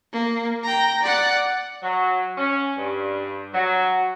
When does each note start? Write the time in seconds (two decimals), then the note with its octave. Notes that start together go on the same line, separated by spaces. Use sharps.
0.13 A#3
0.64 G5 A#5
1.02 D5 F#5
1.83 F#3
2.38 C#4
2.78 G2
3.53 F#3